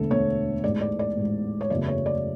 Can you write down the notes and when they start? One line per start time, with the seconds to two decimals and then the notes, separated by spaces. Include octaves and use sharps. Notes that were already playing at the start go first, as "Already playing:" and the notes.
Already playing: E1 D2 D3 A3 A4
0.10 E1 D2 D3 A3 C#5
0.64 A1 G#2 G#3 D5
0.81 D5
0.99 D5
1.17 A1 G#2 G#3
1.61 C#5
1.70 F#1 E2 C#3 F#3 A3 D5
1.88 C#5
2.06 D5